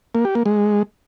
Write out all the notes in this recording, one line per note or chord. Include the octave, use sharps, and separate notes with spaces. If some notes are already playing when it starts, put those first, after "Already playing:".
A#3
G4
A#3
G#3